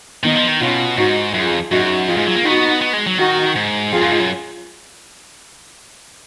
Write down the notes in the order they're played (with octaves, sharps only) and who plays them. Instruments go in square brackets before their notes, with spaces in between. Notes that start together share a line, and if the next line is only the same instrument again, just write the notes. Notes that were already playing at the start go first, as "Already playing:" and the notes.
[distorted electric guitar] D#3 [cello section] B3 D#4
[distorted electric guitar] F3
D#3
[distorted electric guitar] B2 [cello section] C#4 F4
[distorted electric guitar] G#2 [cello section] D#4 F#4
[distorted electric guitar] F#2 [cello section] F4 G#4
[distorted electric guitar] F2
[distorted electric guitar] F#2 [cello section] D#4 F#4
[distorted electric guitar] F2 [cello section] F4 G#4
[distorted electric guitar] G#2
F#3
A#3
[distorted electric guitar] B3 [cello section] D#4 F#4
[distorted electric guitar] B3
G#3
F#3
[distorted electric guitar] D#3 [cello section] D#4 F#4
[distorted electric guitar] G#2
[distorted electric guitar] F2 [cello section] F4 G#4
[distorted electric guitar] F#2
G#2
F#2